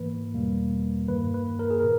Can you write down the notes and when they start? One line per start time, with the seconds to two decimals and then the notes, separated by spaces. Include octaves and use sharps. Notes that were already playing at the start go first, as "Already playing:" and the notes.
Already playing: G#2 E3 A#3 B4
0.34 E2 B2 G3 A#3
1.08 G2 D#3 A#3 B4
1.34 B4
1.59 A#4
1.70 G#4
1.80 A#2 A#4